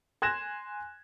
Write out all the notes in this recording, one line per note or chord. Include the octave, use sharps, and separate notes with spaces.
G#5 C6 F#6 G#6 A#6 E7